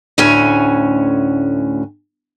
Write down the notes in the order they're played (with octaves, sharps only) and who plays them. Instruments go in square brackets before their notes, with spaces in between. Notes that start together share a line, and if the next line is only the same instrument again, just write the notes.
[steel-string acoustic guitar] D2 A2 C#4 F#4 G#5